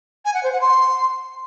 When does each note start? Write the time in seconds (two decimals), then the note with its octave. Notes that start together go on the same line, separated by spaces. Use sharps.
0.25 G#5
0.34 F#5
0.43 C5
0.52 F#5
0.61 C6